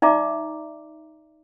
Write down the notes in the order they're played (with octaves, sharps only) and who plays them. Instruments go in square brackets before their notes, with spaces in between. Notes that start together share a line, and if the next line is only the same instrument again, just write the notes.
[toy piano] D#4 D5 E5 A#5 D6